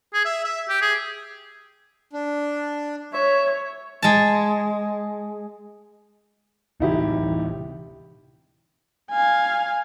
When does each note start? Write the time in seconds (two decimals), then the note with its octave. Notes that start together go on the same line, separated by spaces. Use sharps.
0.14 G#4
0.25 E5
0.45 E5
0.69 G4
0.82 G#4
2.13 D4
3.13 C#5 E5
4.02 G#3 A5
6.80 D1 C3 E3 D#4 E4 G4
9.11 F5 G#5